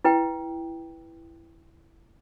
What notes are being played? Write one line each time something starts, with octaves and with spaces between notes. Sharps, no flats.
E4 B4 G5